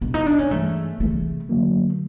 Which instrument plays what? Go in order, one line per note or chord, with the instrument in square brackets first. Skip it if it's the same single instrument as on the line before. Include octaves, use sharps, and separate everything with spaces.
[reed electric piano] E2 B2 G#3 [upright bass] D4
[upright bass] D#4
D4
C#4
[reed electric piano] G2 E3 G#3 [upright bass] A3
[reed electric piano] C3 E3 G#3 [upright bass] A3
[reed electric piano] F2 D3 F#3 A#3